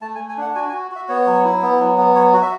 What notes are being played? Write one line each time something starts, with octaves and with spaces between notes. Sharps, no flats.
A3 A5
G#5
A3
G#5
D4 F#5
F#4 G#5
G#5
F#4
F#4 E5
B3 C#5
F#3
E4
B3
F#3
B3
F#3 C#5
F#4
E5